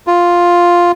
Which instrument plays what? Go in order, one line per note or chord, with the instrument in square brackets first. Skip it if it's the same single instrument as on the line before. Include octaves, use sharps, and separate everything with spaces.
[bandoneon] F4